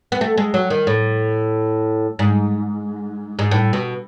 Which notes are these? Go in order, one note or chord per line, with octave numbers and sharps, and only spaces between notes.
B3
A3
G#3
F#3
D#3
A2
G#2
G#2
A2
B2